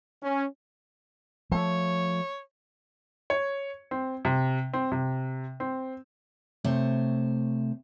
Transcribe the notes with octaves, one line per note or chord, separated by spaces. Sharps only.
C#4
F3 A3 C#5
C#5
C4
C3
C4
C3
C4
C3 A3 C5 C#5